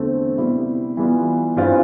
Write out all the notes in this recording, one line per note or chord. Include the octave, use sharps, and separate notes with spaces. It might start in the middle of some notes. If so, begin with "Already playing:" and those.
Already playing: E2 D3 A3 C4
C3 G3 B3 E4
E3 G3 B3 F4
G2 E3 G3 C4 F4